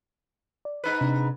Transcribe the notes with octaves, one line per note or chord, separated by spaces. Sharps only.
D5
G#2 D#4 B4
C3 D4